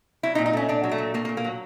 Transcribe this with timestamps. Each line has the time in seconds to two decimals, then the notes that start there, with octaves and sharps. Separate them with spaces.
0.23 F#3 E4
0.35 D#4
0.38 A#2
0.46 D#4
0.53 A3 C#4
0.68 A#2 D4
0.83 F#3
0.91 A3
0.98 A#2
1.14 A3 A#3
1.25 A#3
1.29 A#2
1.37 A#3
1.44 F#3